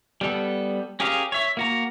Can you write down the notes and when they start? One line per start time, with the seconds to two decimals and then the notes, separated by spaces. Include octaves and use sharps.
0.21 G3 B3 A4
1.00 C#4 G4 G#4 A#4 F5
1.32 C#5 E5
1.57 A#3 F#4 A#5